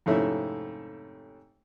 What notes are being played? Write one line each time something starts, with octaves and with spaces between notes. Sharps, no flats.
F2 G#2 C3 A3 C#4 E4